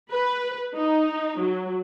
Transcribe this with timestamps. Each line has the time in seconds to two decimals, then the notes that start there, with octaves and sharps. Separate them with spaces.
0.11 B4
0.75 D#4
1.40 F#3